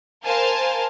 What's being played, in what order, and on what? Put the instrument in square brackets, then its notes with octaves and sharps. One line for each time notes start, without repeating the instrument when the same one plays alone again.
[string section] A#4 C5 F5 G#5 A5